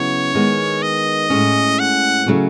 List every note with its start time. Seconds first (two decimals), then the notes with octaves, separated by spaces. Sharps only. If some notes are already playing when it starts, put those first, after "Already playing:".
Already playing: C#3 F#3 B3 E4 C#5
0.35 D#3 G#3 B3
0.82 D#5
1.30 A2 G#3 C#4
1.79 F#5
2.26 C#3 F#3 A3 C#4